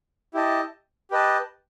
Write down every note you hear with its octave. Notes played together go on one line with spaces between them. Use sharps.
E4 G4 D#5 A5
G4 B4 D#5 A5